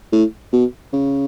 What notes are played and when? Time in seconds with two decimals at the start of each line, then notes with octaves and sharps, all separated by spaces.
0.12 A2
0.53 B2
0.93 C#3